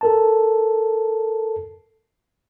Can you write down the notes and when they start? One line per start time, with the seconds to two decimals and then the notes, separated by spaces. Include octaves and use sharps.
0.01 A4 A#4 A5